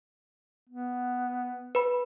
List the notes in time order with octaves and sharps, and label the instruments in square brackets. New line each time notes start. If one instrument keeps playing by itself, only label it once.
[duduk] B3
[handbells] B4 B5